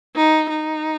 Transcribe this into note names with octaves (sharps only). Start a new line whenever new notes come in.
D#4
D#4